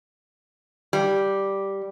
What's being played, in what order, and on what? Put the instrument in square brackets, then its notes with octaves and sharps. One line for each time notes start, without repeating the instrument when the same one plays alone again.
[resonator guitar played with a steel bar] G3